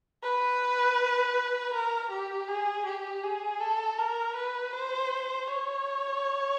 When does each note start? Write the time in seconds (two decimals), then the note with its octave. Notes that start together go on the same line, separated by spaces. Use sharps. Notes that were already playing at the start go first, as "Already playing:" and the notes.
0.23 B4
1.74 A#4
2.11 G4
2.48 G#4
2.86 G4
3.23 G#4
3.61 A4
3.99 A#4
4.36 B4
4.73 C5
5.48 C#5